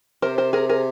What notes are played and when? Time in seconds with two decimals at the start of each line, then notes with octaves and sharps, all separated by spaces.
0.22 C3 A#4 C5
0.38 A#4 C5
0.53 G#4 A#4
0.69 G#4 A#4